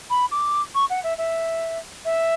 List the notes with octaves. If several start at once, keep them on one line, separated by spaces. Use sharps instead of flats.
B5
D6
C#6
F#5
E5
E5
E5